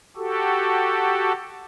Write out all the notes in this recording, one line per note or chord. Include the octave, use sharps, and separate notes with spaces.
F#4 G4 A4